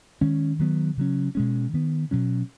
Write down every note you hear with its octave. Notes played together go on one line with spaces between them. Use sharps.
D#3 G#3 C#4
D#3 F#3 B3
C#3 F#3 C#4
B2 G#3 C#4
D#3 B3
B2 F#3 C#4